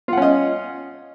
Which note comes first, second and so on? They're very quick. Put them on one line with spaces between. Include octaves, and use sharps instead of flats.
F4 F#5 C#4 D#5